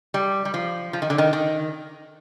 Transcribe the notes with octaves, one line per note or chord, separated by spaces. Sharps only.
G3
G3
F3
F3
D#3
D3
D#3
D#3